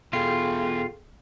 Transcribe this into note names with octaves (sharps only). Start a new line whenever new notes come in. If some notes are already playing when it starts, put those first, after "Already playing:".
E2 B2 F4 G#4 A4 G5